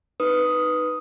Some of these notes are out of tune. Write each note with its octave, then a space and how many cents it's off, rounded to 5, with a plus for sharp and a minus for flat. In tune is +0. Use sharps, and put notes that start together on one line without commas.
D#4 -5 B4 +0 D#6 +0